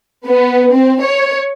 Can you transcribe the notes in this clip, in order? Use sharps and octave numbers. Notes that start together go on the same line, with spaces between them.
B3
C4
C#5